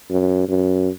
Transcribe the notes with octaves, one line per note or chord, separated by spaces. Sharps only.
F#2
F#2